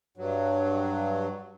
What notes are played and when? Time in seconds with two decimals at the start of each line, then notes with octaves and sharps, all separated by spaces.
0.17 G2 F#3